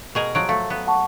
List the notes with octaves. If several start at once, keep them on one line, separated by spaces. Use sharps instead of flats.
B2 G#4 A#4
F3 F#3 D7
A3 F5
B3
F#5 A5 C#6